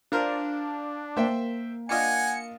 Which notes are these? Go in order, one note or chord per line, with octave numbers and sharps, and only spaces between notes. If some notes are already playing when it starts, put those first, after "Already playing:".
D4 F4 A#4 C5
A#3 A#4 C5 E5 G5
D4 F4 D#5 F#5 G#5 C#7